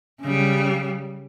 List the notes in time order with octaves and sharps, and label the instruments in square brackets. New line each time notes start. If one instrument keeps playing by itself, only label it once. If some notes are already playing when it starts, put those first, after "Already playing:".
[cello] C#3 G3